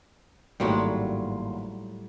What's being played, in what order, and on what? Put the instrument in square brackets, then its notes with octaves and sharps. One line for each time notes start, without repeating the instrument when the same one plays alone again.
[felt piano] G#1 A#3 C6 [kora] A2 F#3 G3